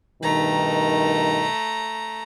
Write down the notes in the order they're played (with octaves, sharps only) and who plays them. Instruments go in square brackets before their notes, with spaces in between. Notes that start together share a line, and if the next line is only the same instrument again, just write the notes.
[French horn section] G2 B2 D#3 [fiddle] A3 A#5